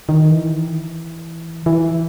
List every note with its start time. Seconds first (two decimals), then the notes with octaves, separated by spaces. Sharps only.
0.09 D#3
0.31 E3
1.66 E3